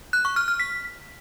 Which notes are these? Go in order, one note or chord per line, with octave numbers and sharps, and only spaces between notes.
F#6
C#6
F6
F6
B6